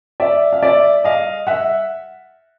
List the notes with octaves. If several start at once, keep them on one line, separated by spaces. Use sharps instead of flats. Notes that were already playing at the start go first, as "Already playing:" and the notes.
D5 E5
F5
D5 E5
D#5 F5
E5 F#5